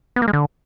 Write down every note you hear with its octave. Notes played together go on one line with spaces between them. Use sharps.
B3
A#3
G#3
D3